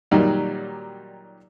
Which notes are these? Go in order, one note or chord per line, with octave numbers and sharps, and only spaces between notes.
A#2 D#3 F#3 G3 A#3 D#4